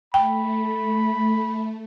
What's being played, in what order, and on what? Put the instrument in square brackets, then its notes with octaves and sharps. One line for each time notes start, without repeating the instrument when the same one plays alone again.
[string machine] A3 [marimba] G5 [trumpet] B5